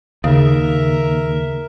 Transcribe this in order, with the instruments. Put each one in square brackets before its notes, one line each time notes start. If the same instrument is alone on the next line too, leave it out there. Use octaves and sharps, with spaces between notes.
[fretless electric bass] D#2 [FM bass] C#3 [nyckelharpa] A#4 E5